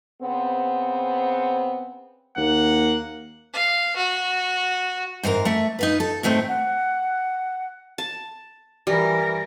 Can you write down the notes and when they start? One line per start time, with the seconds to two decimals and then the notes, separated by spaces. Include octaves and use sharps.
0.22 C#3 B3 C4
2.37 D#2 A#3 F#5
3.53 F5
3.96 F#4
5.23 G#2 E3 C4 A#4
5.45 A3 E5
5.79 D#4 F4 B4
6.00 A4
6.23 A2 D#3 A3 C4
6.48 F#5
7.98 A5
8.87 E3 G3 A#4